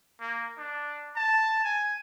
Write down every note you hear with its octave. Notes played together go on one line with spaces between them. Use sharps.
A#3
D4
A5
G#5